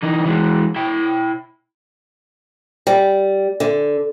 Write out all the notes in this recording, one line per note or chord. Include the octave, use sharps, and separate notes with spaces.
E3 D#4
E3 G#3
E4 G5
G3
D3